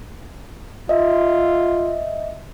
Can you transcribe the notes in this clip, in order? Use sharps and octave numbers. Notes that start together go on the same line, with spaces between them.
F4 D#5 E5